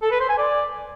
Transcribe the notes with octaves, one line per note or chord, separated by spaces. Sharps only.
A4
B4
C5
G#5
D5